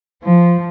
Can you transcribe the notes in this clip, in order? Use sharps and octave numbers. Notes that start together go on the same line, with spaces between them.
F3